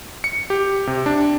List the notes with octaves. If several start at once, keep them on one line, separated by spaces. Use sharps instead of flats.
C#7
G4
C3
D4